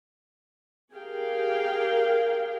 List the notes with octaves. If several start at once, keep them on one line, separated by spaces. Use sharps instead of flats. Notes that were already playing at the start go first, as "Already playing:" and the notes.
G4 G#4 A#4 F5 G5